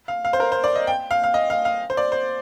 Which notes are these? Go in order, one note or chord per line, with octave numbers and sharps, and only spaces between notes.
F5
F5
C5
A#4
C5
D5
D#5
G5
F5
F5
D#5
F5
F5
C5
D5
C5